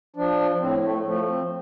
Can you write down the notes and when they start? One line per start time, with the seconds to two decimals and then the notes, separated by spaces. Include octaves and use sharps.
0.16 F3 D4
0.60 A2 C4
0.83 A3
1.05 F3 A3
1.27 C4